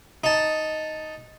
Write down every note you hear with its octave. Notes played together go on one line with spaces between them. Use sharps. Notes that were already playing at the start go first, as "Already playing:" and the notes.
D#4 A5